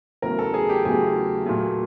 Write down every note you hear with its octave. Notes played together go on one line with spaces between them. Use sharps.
E2 C#3 F#3 A3 A#4
A4
G#4
G4
E2 C#3 F#3 A3 G#4
A#2 F#3 A3